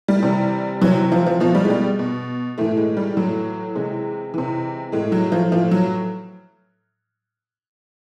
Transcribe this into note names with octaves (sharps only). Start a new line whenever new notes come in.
G3
C3 E3
C3 E3 F#3
F3
F3
B2 F3
G3
G#3
G3
B2
A2 E3 A3
G#3
G3
A2 E3 F#3
C3 E3 G#3
C3 E3
A2 E3 G#3
F#3
F3
A2 E3 F3
F#3